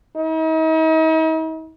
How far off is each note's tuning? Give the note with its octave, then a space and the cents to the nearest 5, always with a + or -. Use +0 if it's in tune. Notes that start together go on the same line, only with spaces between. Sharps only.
D#4 +45